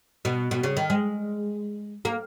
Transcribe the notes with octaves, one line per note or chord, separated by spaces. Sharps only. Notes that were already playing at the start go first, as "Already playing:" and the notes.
B2
B2
C#3
D#3
G#3
A#3